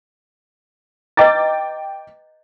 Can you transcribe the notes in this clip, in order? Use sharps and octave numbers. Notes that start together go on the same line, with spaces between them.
B4 D#5 G5 A#5 D6 A6